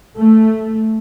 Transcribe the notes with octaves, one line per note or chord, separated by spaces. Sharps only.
A3